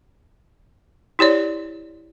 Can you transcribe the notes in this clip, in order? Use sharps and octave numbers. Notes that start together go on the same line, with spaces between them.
E4 G4 C#5 D5